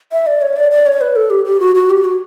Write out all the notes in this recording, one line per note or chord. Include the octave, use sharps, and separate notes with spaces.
E5
D5
C#5
D5
D5
C#5
B4
A4
G4
G4
F#4
F#4
G4
F#4